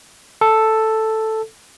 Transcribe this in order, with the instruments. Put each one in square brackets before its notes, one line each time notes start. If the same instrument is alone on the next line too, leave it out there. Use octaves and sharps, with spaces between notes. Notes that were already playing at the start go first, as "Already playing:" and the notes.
[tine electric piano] A4